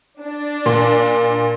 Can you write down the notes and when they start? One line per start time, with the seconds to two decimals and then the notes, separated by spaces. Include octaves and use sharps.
0.21 D4
0.66 A#2